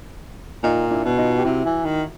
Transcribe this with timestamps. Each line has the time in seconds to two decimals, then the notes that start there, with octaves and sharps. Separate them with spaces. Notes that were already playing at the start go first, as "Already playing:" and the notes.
0.64 A#2 D#4 F4
0.91 D4 E4
1.05 B2
1.18 D#4 F4
1.38 G4
1.45 C3 E4 F#4
1.66 E3
1.85 D#3